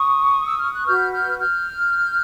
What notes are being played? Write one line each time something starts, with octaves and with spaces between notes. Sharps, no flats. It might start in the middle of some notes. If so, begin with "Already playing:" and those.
Already playing: C#6 D#6
E6
F6
F#6
F#4 B4 F6 G6
F6 G6
F6 G6